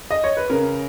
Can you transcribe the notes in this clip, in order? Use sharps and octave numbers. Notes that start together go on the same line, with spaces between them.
D#5
C#5
B4
C#3 A#4